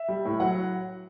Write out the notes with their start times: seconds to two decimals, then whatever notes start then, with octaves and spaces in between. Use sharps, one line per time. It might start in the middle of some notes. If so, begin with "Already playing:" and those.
Already playing: E5
0.08 G3
0.25 A2
0.40 F#3 F#5